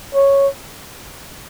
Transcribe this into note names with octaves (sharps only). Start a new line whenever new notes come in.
C#5